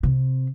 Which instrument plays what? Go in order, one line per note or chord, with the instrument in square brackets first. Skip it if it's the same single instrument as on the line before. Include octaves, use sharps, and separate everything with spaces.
[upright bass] C3